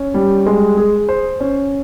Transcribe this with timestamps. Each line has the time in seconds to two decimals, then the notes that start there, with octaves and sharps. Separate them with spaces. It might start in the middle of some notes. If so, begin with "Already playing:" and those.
Already playing: C#4
0.14 G3
0.46 G#3
0.77 G#4
1.09 C5
1.40 C#4